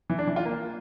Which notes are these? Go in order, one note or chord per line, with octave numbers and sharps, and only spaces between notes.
E3
D4
E3
F4
A#3